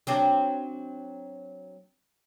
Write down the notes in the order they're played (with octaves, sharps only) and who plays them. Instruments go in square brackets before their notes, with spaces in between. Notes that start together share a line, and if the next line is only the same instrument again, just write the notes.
[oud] F#3 C4 D4